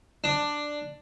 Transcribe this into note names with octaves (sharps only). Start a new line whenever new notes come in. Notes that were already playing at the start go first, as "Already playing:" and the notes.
D4